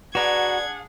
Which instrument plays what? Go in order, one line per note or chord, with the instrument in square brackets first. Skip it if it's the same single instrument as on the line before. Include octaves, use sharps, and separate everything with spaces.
[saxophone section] D4 G#4 F#5 [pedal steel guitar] F#4 A#5 [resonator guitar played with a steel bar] B4 D5 [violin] G#6